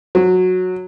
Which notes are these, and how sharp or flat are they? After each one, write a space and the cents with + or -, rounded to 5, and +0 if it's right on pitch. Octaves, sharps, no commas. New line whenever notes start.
F#3 -15